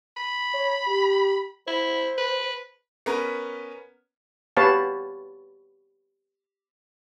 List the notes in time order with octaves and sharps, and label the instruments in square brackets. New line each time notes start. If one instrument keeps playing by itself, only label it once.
[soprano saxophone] B5
[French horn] C#5
G4
[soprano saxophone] E4 [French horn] C5
[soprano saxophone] B4
[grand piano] B3 C#4 A#4 B4
[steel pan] B3 G4 B4 C#5 F5 A5